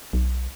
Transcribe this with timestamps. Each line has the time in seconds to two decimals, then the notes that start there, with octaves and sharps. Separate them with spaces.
0.13 B1